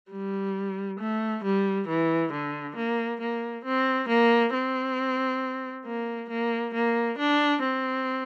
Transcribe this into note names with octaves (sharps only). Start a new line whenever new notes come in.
G3
A3
G3
E3
D3
A#3
A#3
C4
A#3
C4
A#3
A#3
A#3
D4
C4